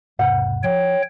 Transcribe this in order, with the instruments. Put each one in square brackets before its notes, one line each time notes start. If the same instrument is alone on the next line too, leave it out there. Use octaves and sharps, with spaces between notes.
[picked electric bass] E1 G#2 C3 [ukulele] F#5
[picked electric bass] F3 [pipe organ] C#5 G5